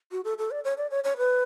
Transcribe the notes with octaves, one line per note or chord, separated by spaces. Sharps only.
F#4
A4
A4
D5
C#5
D5
C#5
C#5
B4